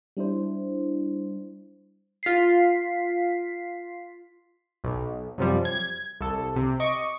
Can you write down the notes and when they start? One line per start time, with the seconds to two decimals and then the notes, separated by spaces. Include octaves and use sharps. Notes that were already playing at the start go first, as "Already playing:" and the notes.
0.17 G3 D4 E4 C5
2.23 F4 B6 C7
4.84 B1
5.38 F#2 C3 F3 G3
5.65 G#6
6.21 C2 A4
6.56 C3
6.80 D#5 C#6 D6